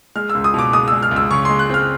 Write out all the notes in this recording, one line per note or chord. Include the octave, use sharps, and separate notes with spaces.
G#3 F6
E6
C#2
D#6
B2 D6
G#3 D#6
G#3 E6
F6
C#2
E6
C#3 C#6
G#3 C6
F#6
C4 F6